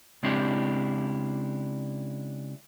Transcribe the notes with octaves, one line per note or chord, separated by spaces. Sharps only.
C#3 G#3 C4 D4 E4 G4